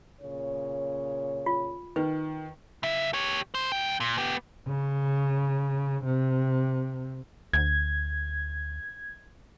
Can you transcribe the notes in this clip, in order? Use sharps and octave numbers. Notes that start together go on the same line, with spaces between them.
A#2 C#3 C#5
F4
D#3 B4
C#3 E5
G4 C#5
C2 C5
D2 G5
A#2
B3 G4
C#3
C3
D2 G#6